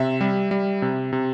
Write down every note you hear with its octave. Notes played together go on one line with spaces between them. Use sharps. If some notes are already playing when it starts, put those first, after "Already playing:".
Already playing: C3 E5
G3
G3
C3
C3